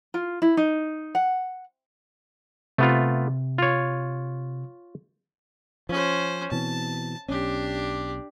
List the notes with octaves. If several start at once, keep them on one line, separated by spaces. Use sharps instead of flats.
F4
E4
D#4
F#5
C3 A3 B3 F4
F4 C#5
F3 C#4 C5
B2 E3 C4 A5
B1 C#4 D4 G4